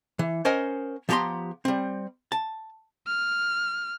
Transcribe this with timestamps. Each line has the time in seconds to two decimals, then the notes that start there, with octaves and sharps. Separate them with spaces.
0.19 E3
0.45 C#4 A#4 C5 D#5 F#5 G#5
1.09 F3 B3 G4 G5 A#5 C6
1.65 G3 C4
2.32 A5
3.07 F6